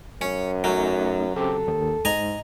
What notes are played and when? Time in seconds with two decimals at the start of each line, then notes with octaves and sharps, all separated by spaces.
0.21 F#2 C#4
0.64 F#3 A3 C#4 D#4
1.36 C#3 C4 G4 A4
1.68 D#2 D#3
2.05 G#2 D#5 G#5 A#5